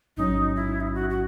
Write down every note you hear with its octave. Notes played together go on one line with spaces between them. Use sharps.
A1 G#2 F#3 C#4 D#4
E4
D#4
E4
F#4
F#4